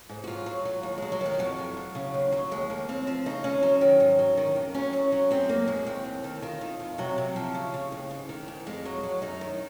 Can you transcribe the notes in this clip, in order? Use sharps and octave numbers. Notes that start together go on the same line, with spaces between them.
G#2
F#4
F#3 F4
F#3
F#3
D#2
F#3 G#3
F#3
D#3 G#3
F2 F#3
F2
F2
C#3
D#2
F#3
D#2 G#3
D#2 A#3
D#2 C4
F3 C4
C#3 D#4
D#2 C#4
F#3
D#3
G#2
F#3
D#3
F2
F#3 C#4
F#3
F#3
F#2 C4
F#2 A#3
F#2 G#3
D#2 C4
D#2
D#3
D#3 F4
D#3
F2
C3 F#3
C3
F3
C#3
C#3
D#2
G#2
D#3
G#2
F2 G#3
F#3
F#3
F#2 D#4
D#3